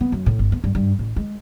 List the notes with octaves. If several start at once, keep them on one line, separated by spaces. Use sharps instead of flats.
B3
F#2
A2
G1
B3
G2
G2
A1
G#3